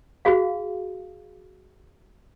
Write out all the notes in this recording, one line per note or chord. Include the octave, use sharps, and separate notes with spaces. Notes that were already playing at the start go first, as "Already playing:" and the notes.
F#4 G#4 F5